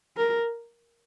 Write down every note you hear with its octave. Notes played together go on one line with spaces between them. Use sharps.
A#4